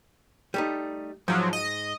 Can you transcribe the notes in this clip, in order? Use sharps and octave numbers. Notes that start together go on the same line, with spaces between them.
G3 A3 D#4
G#2 F3 F#3
D#5